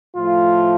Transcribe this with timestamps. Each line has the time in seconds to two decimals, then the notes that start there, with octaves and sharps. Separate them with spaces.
0.16 A2 F3 A3 F4